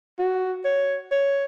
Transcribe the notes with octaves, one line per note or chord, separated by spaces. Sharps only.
F#4
C#5
C#5